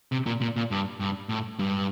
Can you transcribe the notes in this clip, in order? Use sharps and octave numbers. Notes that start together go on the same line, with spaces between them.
C3
A#2
A#2
A#2
G2
G2
A2
G2